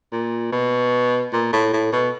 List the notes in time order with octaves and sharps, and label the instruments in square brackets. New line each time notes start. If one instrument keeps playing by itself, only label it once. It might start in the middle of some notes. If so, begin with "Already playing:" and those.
[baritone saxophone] A#2
B2
A#2
A2
A2
B2